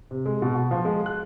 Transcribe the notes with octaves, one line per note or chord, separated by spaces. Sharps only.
C3
G#3
B2
F#4
F3
G#3
F#6